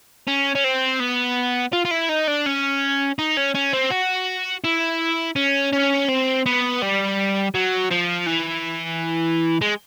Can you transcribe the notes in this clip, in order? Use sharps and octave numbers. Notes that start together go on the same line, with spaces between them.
C#4
C#4
C4
B3
F4
F4
E4
D#4
D4
C#4
D#4
C#4
C#4
C4
F#4
E4
C#4
C#4
C4
B3
G3
F#3
F3
E3
G#3